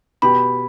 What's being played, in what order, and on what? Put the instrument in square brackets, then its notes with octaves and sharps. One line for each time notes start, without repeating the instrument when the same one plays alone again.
[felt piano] B2 B3 G4 [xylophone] B5